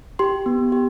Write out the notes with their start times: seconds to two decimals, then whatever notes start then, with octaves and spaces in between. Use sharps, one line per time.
0.19 G4 C6
0.46 B3
0.72 G4